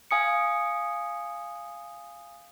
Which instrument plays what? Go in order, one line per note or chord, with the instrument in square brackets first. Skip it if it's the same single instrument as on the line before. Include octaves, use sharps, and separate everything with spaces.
[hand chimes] F5 G#5 D#6 C#7